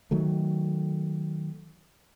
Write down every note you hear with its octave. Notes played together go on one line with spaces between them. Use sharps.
D#3 F#3 A3